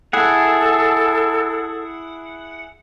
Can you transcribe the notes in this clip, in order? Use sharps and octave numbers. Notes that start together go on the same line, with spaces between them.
E4 G#4 A4 F#5